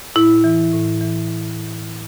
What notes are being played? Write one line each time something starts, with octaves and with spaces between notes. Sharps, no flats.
A2 E4
E3
A2
E3